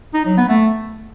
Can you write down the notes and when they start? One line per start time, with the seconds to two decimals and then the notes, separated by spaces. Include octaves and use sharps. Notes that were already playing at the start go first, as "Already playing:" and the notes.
0.14 D#4
0.25 F#3
0.37 B3
0.49 A3